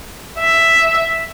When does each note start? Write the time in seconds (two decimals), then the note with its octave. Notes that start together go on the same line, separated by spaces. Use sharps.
0.39 E5